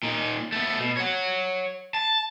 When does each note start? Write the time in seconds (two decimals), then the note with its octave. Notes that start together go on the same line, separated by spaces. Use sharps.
0.03 A#2 D#4
0.52 A3 B3
0.79 B2
0.97 C#5 F#5
1.94 A5